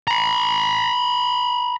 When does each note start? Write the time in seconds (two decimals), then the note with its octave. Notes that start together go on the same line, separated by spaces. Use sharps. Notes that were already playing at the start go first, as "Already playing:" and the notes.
0.07 A#5 B5